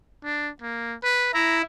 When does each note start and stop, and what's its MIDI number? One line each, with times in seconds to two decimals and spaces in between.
0.24 0.50 62
0.62 0.95 58
1.03 1.31 71
1.34 1.62 64
1.34 1.57 82